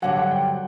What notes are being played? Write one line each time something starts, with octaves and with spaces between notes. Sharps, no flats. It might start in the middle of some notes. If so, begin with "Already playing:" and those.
G2 D3 F#3 F#5
F#5
G5